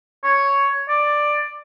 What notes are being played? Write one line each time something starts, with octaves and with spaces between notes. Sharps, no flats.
C#5
D5